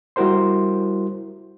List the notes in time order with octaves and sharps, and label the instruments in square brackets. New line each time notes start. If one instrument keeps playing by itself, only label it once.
[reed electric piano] G3 E4 F#4 A#4 C5 C6